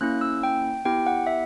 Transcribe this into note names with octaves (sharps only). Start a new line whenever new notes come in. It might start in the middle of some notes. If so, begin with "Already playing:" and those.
A#3 C#4 E4 F#6
E6
G5
B3 E4 G4 G5
F#5
E5